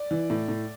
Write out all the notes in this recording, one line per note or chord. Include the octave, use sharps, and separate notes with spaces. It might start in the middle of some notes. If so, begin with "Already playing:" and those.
Already playing: D5
E3
A2
A2